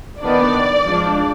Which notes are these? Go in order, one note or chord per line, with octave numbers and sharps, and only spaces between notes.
D#3 B3 D4 D5
F3 G#3 D4